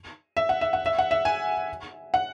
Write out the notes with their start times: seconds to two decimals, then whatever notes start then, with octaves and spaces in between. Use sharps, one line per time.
0.37 E5
0.49 F#5
0.61 E5
0.73 F#5
0.86 E5
0.99 F#5
1.11 E5
1.25 G#5
2.14 F#5